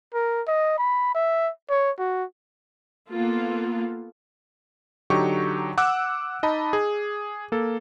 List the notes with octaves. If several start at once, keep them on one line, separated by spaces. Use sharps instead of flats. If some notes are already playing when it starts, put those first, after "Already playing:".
A#4
D#5
B5
E5
C#5
F#4
A#3 B3 F4 A4
D3 F#3 D#4 G4 C#6
F#5 D6 E6 F#6
D#4 D#5 A5 B5
G#4
A#3 A4